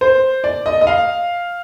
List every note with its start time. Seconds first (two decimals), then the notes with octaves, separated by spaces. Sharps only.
0.01 C5
0.44 D5
0.66 D#5
0.81 D#5
0.87 F5